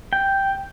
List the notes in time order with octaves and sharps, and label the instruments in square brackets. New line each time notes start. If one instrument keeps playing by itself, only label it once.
[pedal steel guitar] G5